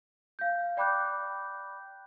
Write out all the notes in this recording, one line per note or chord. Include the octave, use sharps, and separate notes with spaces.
F5 G6
D5 G5 B5 D6 F#6 G6